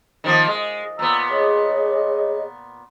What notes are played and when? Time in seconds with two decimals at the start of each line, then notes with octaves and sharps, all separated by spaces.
0.24 D#3 F3 A#3
0.48 G#3
0.99 A#2 B3 A#5 E6
1.30 G#4 C#5 D#5